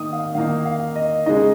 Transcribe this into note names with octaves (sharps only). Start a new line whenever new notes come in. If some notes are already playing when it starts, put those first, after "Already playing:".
Already playing: D#3 A#3 D#4 D#6
F5
D#3 A#3 D#4 F5
F5
D#5
C#3 G#3 D#4 D#5